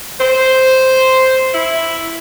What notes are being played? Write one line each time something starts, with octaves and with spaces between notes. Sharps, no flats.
C5
E4